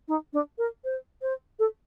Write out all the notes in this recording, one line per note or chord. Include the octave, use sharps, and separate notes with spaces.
D#4
D4
A#4
C5
C5
A4